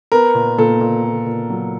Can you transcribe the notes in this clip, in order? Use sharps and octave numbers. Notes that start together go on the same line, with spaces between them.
B3 A#4
A#2
A#2 A4
A#2
A#2
A#2
F#3